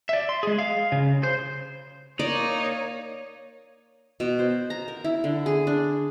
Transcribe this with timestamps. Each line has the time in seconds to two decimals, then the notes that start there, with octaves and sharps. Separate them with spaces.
0.09 D5 E5
0.29 C6
0.43 G#3 G#4
0.59 F5
0.92 C#3
1.23 C5
2.19 A#3 D#4 C#5 D5
4.20 B2
4.39 C5
4.70 A#5
4.88 A#4
5.04 E4
5.24 D3
5.46 G#4
5.67 D4